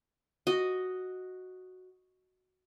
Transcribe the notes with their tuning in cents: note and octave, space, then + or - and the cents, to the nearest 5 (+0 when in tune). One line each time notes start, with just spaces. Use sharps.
F#4 +0 D#5 +0